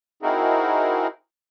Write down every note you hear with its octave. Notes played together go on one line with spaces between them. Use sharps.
C4 D#4 E4 F#4 G#4 A#4